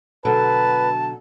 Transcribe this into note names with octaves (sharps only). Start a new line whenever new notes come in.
B2 D3 F#3 B4 A5